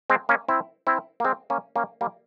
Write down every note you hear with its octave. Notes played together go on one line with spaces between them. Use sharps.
G#3 C4
A#3 C#4
C4 E4
C4 E4
A#3
G#3 C4
A#3 C#4
A#3 C#4
G3 A#3